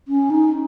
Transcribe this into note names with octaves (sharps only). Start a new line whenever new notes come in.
C#4
D#4